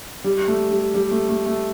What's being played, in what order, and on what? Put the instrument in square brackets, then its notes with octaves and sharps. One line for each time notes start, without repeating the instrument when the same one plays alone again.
[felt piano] G3
A3
G3
G3
A3
A3
A3